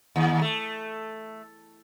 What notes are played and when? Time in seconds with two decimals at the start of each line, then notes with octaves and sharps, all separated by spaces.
0.16 D#2
0.41 A3